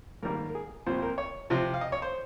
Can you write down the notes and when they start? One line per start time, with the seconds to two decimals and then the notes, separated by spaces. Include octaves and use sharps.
0.23 G#2 D#3 G3 A#3 A#4
0.50 A#4
0.55 G#4
0.86 C2 A#2 F3 C4 C5
0.98 C5
1.02 A#4
1.18 C#5
1.50 C3 F3 C4
1.74 F5
1.81 D#5
1.92 C#5
2.02 C5